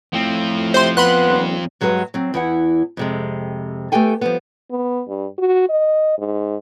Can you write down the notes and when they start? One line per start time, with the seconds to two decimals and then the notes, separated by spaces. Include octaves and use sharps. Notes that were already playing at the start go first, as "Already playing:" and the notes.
0.13 A2 F3 C4
0.74 C3 C5 C6
0.97 B3 B5 C6 F#6
1.27 D#1
1.81 G2 F#3 G#3 G#4 B4 F#5
2.14 F#3 C4
2.34 E2 E4 F#5
2.97 F2 C3 G#3
3.92 A3 B3 G4 A4 G5 G#5
4.21 F3 G3 B3
4.70 B3
5.08 G2
5.38 F#4
5.69 D#5
6.18 G#2